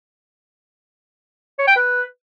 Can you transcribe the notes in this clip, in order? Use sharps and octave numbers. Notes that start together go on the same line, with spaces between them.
C#5
G5
B4